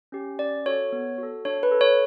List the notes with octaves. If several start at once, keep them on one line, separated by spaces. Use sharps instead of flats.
C#4 G4
C#4 D5
F#4 A4 C#5
B3
F#4 A4
D4 C#5
B4
A4
C#5